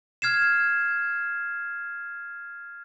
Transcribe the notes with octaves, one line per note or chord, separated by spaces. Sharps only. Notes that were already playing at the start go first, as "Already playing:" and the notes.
F6 G#6 C7 E7